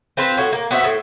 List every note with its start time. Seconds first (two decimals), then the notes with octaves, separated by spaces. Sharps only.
0.17 C4 F4 B4 C5
0.37 A2 F#4 C#5
0.52 A#3
0.71 B3 F#4 C5 E5
0.84 A2